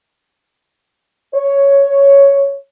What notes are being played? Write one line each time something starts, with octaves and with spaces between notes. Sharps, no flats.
C#5